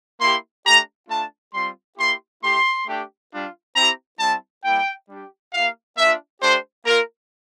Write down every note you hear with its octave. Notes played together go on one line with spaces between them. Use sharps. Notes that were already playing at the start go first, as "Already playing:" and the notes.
A#3 E4 G4 C6
A3 D4 G4 A#5
A3 D4 F4 A5
G3 C4 F4 C6
A#3 E4 G4 C6
A3 E4 G4 C6
A3 D4 G4
G3 D4 F4
C4 E4 G4 A#5
G3 C4 E4 A5
G3 A#3 E4 G5
G3 D4 G4
A#3 E4 G4 F5
A#3 D4 F4 E5
A3 D4 G4 C5
A#3 F4 A#4